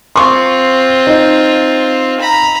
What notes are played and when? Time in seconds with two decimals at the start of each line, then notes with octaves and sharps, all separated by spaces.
0.16 C4 F4 C6 C#6
1.07 D#4
2.20 A#5 B5